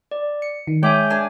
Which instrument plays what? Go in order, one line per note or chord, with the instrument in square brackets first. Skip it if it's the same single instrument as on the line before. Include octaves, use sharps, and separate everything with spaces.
[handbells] D5
C#7
[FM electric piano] D#3
[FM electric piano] G#3 [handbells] C#5 E5 G#5 [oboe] G5 [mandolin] D6
[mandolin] D4 G#5